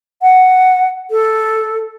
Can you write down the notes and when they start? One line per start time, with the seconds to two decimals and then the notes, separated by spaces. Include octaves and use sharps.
0.22 F#5
1.11 A4